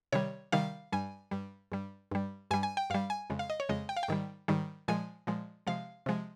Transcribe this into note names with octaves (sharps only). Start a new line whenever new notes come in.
C3 D#3 G3 C#5
C3 D#3 G3 F5
G2 G3 G#5
G2 G3
G2 G3
G2 G3
G2 G3 G#5
G#5
G5
G2 G3 F5
G#5
F2 C#3 G#3
F5
D#5
C#5
F2 C#3 G#3 D#5
G5
F5
G5
G#2 D#3 G3
G#2 D#3 G3
A#2 F3 G#3 G#5
A#2 F3 G#3
C3 F3 G#3 F5
C3 F3 G#3